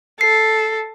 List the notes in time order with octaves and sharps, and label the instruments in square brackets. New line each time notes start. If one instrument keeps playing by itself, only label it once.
[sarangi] A4 [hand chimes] C7